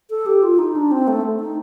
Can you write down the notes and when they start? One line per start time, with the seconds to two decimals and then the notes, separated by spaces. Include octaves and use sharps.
0.10 A4
0.26 G4
0.43 F4
0.59 D#4
0.76 D4
0.91 C4
1.08 A3
1.40 D#4